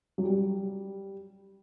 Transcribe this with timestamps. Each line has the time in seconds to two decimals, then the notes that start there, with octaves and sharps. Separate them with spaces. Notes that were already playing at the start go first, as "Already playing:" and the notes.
0.18 F#3
0.24 G3